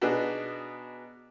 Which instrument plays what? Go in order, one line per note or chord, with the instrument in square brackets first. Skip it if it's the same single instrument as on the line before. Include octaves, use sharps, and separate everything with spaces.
[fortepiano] B2 B3 D4 D#4 G#4